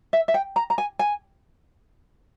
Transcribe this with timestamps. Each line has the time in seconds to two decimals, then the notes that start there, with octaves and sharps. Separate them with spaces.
0.13 E5
0.28 E5
0.34 G5
0.56 A#5
0.70 A#5
0.78 G#5
0.99 G#5